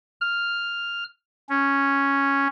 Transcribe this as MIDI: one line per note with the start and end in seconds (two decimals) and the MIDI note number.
0.21 1.04 89
1.49 2.47 61